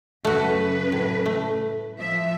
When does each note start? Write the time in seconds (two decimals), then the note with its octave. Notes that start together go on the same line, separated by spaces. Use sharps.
0.25 F#2 C#3 A3 F#4 B4
0.92 A2
1.26 A3
1.99 F3 E5